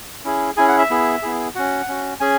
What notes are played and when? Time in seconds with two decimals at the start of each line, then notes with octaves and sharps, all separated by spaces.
0.24 C#4 E4 G#4
0.57 C#4 E4 G#4 G#5
0.68 F#5
0.79 E5
0.90 B3 E4 G#4
1.22 B3 E4 G#4
1.55 C#4 F#4 F#5
1.88 C#4 F#4
2.20 C#4 G#4 G#5